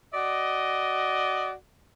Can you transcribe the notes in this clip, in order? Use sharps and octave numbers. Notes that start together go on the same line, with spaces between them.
F#4 D5 D#5